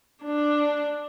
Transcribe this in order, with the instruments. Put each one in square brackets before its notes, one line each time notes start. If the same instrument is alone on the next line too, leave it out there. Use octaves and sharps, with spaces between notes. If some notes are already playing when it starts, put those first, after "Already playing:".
[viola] D4